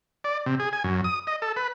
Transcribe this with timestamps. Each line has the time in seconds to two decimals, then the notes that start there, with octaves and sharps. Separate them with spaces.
0.24 D5
0.46 C3
0.60 G#4
0.73 G#5
0.84 F#2
1.04 D#6
1.27 D#5
1.42 A4
1.56 B4